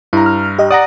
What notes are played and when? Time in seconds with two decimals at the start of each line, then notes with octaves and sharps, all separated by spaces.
0.13 G2 E4 A#5
0.26 F6
0.59 G4 D#5
0.70 D5 F#5 A#5 D#6 A#6